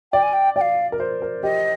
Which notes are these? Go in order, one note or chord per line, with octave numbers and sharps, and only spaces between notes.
D5 G5
G#5
G5
D5 G5
F5
A#4
C5
A#4
G4 D#5